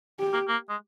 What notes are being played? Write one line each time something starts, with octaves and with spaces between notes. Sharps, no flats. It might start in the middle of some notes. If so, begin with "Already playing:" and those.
G4
A#3
A#3
G#3